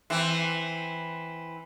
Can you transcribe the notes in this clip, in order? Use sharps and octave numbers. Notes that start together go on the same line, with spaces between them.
E3 C4